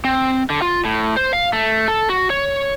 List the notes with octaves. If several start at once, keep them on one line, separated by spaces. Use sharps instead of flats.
C4
D3
F4
A2
C5
F5
A3
A4
F#4
C#5